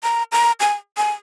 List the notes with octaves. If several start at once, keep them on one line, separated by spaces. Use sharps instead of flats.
A#5
A#5
G#5
G#5